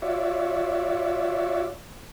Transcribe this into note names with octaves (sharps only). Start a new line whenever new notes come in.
F4 F#4 C#5 D5 E5